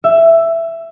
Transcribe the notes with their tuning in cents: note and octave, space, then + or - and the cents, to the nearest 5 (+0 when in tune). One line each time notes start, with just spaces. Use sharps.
E5 +10